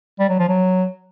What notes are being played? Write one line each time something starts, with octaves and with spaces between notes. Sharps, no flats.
G3
F#3
F3
F#3